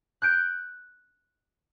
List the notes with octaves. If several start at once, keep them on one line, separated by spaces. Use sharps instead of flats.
F#6 G6 D7